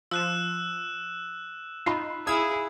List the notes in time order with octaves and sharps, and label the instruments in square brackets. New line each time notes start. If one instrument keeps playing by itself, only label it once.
[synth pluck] F3 [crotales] E6 F#6 E7
[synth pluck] D#4 F4 [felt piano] B5 C7
[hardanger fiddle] E4 G#4 [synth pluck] F5 E6 G#6 [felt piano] D#6